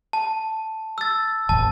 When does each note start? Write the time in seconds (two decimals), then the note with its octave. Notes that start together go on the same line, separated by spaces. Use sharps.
0.13 A5
0.98 E6 A6
1.49 D#1 G#1 A5